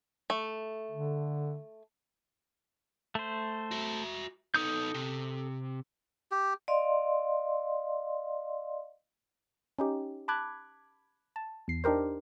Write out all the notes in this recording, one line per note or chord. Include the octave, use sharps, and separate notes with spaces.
A3
D3
A3 C5
F#4 E5
B3 D#4 A4 D#6 G6
C3
G4
D5 D#5 F5 C6
C#4 D#4 G4
A5 B5 D6 F#6 G#6
A5
E2 C7
D4 D#4 G4 A#4 C5